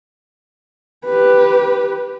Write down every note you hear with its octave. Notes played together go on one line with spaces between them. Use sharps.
G4 B4